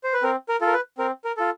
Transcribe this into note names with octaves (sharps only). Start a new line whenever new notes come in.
C5
B4
C4 A#4
A#4
F4 A4
A#4
B4
C4 A#4
A#4
F4 A4